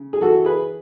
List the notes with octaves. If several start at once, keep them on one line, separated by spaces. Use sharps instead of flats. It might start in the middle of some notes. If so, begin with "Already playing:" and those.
Already playing: C#3
G#4
E3 F#4 A4
G#4 B4